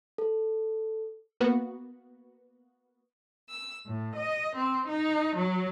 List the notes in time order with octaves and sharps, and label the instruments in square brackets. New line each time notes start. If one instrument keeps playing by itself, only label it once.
[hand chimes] A4
[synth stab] A#3 B3 F#4
[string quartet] E6
A2
D#5
C4
D#4
F#3